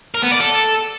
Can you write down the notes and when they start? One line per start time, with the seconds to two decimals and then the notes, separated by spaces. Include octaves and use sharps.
0.15 A#4
0.23 B3
0.32 D5
0.40 A4